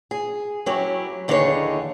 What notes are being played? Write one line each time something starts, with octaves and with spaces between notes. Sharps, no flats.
G#4
F#3 C#4 E4 G4
D#2 D3 E3 D#4 G#4 C#5